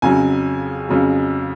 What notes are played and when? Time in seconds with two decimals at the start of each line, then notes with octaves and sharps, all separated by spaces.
0.02 F2 C#3 F#3 G#5
0.89 F2 C#3 F#3